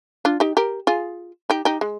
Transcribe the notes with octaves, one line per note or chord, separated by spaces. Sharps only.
D4 F4
D#4 G4
G4 A#4
F4 G#4
D#4 G4
D#4 G4
G#3